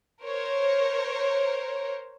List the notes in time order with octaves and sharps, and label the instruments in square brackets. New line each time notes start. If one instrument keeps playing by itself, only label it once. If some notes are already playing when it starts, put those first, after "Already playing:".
[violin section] A#4 C5 C#5